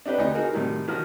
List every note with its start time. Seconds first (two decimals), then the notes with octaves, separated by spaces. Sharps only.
0.06 D4 D#4 G4 B4
0.18 D2 D#4
0.35 D#4 F#4 G#4 A#4
0.53 A2 C3 D#3 F#3 G3
0.88 D#3 F3 F#4 F6